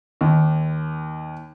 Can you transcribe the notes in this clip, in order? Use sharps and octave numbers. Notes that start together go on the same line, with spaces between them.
D#2